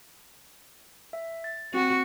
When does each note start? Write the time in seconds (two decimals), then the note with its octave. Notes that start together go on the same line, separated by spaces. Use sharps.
1.13 E5
1.44 A6
1.74 C4 F#4